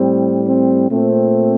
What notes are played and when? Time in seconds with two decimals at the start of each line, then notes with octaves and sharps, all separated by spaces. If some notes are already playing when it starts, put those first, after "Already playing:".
Already playing: A2 G3 C4
0.47 C4
0.90 A#2 A3 C4